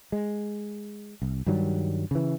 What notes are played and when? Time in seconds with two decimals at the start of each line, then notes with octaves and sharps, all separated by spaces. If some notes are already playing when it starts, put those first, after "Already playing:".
0.12 G#3
1.22 C2
1.46 G2 D#3 F#3 G3
2.11 C#3 E3